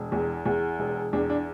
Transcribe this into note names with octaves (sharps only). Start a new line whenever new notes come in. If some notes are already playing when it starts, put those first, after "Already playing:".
Already playing: E1
E2
E2
E1
E2 D4
D4